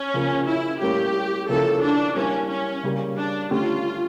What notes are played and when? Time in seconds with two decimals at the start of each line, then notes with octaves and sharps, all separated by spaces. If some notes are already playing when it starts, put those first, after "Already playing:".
Already playing: C#4
0.14 C#3 F3 A#3
0.47 E4
0.81 A2 G3 A#3 C#4 G4
1.49 C#3 F3 A#3 C#4 E4 A4
1.82 D4
2.16 G3 A#3 C#4 E4
2.50 C#4
2.83 C#3 G3 A#3
3.17 D4
3.51 D3 A3 C#4 F4 G4